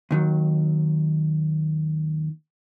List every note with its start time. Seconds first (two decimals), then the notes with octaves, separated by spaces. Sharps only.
0.11 D#2 D#3 F#3